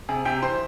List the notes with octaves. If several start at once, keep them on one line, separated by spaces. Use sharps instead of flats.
C3 G#4
C3 G4 G5
E3 C5 C6